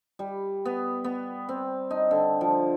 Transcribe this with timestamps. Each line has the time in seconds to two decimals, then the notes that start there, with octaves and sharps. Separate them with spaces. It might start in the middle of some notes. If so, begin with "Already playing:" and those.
0.19 G3
0.65 B3
1.04 B3
1.49 C4
1.91 D#4
2.11 D3
2.41 F3